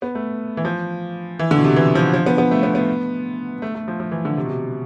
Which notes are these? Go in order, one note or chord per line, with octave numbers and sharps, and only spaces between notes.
B3
A3
E3
F3
E3
D3
B2
C3
E3
F3
F3
B3
B3
A3
B3
B3
A3
A3
F3
F3
E3
D3
C3
B2
C3